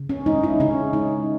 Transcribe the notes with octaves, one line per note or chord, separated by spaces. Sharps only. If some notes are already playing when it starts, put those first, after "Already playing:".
Already playing: C#3
C#4
G#3 D#4
E4
C#3 C#4
G#3 D#4